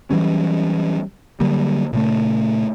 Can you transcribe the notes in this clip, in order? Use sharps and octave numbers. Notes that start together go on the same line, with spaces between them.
E3 F#3 G3 C#4
D3 F#3 G3 A#3
A#2 C#3 A3